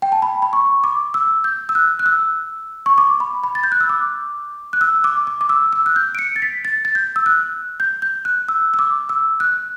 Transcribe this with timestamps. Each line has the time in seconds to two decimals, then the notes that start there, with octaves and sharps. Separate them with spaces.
0.02 G5
0.12 A5
0.22 B5
0.42 B5
0.53 C#6
0.84 D6
1.14 E6
1.44 G6
1.69 E6
1.75 F#6
1.99 F#6
2.06 E6
2.86 C#6
2.98 D6
3.20 B5
3.44 B5
3.55 A6
3.64 G6
3.72 F#6
3.81 E6
3.89 D6
4.73 F#6
4.81 E6
5.04 D6
5.27 D6
5.41 D6
5.49 E6
5.73 E6
5.86 F#6
5.96 G6
6.15 D7
6.19 C#7
6.36 A6
6.42 B6
6.65 A6
6.85 A6
6.95 G6
7.16 E6
7.26 F#6
7.80 G6
8.02 G6
8.25 F#6
8.49 E6
8.74 E6
8.79 D6
9.09 E6
9.40 F#6